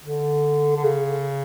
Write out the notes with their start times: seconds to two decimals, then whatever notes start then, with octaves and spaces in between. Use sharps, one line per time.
0.04 D3
0.76 D3
0.84 C#3